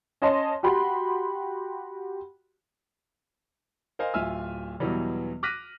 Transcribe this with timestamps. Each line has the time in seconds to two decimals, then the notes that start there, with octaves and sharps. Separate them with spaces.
0.22 C#4 D#5 A5 C6
0.63 F#4 G4 B5 C6
3.99 A#4 C5 D#5 F5 G#5
4.14 D1 F4 E5 G#5 E6 F6
4.80 E2 B2 E3 F#3 G3
5.43 D6 F6 F#6 A#6 B6 D#7